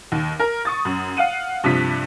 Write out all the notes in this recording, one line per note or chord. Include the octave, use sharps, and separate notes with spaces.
D#2
A#4
C#6 D#6 A6
F#2
F5 F#5 D#7
G2 C3 F3 B6